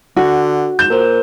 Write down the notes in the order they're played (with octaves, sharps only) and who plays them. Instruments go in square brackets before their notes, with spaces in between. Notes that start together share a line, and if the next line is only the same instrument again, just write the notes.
[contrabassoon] D3 [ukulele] F#4
[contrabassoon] G#2 [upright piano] G6 E7
[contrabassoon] A#2 [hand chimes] A#4 C5